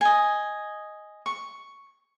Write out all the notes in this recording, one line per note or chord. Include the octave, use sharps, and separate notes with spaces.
D#5 G#5
C#6